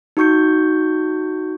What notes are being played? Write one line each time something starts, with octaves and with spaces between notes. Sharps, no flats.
D#4 F#4 C#6 G6 C#7